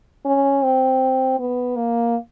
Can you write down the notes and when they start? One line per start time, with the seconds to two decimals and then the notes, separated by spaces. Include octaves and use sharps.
0.25 C#4
0.64 C4
1.39 B3
1.76 A#3